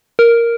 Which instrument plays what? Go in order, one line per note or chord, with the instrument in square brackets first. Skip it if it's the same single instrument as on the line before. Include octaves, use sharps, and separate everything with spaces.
[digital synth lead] A#4